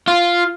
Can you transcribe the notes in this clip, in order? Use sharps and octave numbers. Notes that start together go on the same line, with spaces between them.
F4